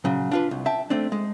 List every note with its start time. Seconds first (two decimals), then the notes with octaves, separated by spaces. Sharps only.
0.04 A#2 C#3 F#3
0.31 D4 F4 B4
0.51 C2
0.66 E5 G5 A5
0.90 A3 C4 D4
1.12 G#3